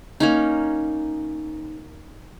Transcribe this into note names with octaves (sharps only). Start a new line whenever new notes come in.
A#3 C#4 D#4